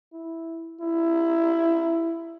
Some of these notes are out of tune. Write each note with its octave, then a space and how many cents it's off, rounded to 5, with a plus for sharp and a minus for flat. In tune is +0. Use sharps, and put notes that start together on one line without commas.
E4 -5
E4 +15